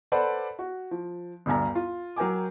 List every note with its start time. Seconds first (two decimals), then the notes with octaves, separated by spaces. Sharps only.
0.12 A4 B4 C5 D5 F#5 B5
0.59 F#4
0.91 F3
1.46 G1 D2 G2 G#5 A#5
1.75 F4
2.16 F#3 A#4 G5 G#5 D6